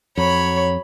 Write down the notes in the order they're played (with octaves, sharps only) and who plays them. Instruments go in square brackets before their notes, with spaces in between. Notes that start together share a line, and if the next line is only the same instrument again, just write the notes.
[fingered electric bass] F2 [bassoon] F#3 [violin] C#5 B5